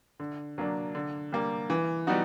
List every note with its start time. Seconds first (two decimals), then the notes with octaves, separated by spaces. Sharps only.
0.20 D3
0.58 F#3 A#3 D4
0.95 D3
1.32 G3 A#3
1.70 E3
2.07 G3 B3 D#4 F#4